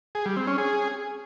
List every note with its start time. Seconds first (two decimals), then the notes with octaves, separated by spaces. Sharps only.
0.15 G#4
0.26 G3
0.37 C4
0.47 C#4
0.58 G#4